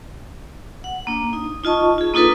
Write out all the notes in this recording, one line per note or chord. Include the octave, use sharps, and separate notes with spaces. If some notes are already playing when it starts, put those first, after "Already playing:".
F#5
A#3 D4
D#4
D#4 F4 D#5 A5 C#6
F4 G#4
A#3 D4 D#4 F4 A4 B4